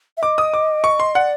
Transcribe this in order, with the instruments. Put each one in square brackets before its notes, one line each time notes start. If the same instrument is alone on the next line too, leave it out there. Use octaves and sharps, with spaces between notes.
[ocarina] E5
[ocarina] D#5 [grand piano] D6
[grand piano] D#6
D6
C#6
C6
[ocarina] D5 [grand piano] F#5